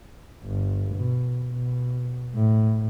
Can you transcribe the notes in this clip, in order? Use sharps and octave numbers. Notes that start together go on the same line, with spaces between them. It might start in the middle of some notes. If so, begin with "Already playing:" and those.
G1
B2
B2
A2